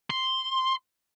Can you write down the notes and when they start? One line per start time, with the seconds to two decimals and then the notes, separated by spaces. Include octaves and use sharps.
0.10 C6